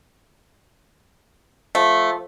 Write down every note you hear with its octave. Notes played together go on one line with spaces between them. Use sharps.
F3 A3